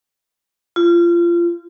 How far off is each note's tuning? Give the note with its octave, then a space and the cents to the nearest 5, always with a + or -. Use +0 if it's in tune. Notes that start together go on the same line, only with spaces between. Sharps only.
F4 -25